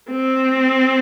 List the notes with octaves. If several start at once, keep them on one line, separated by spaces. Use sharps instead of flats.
C4